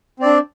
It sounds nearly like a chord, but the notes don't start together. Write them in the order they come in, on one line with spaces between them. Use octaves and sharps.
C4 D5 D4